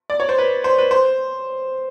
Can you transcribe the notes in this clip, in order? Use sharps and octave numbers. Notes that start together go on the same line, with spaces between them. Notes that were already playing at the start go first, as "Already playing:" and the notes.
D5
C#5
C5
B4
C5
B4
C5